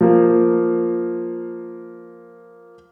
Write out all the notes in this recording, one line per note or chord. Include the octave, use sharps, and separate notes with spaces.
F3 A#3